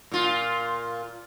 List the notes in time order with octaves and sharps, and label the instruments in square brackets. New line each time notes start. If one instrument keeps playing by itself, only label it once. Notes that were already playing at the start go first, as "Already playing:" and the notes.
[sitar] A#2 F4